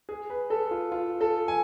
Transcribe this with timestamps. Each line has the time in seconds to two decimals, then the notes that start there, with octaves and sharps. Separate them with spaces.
0.09 G#4
0.30 B4
0.50 A4
0.71 F4
0.92 F4
1.21 A4
1.48 G#5